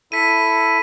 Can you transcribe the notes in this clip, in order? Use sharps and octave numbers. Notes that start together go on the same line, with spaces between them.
E4 A4 B6 D#7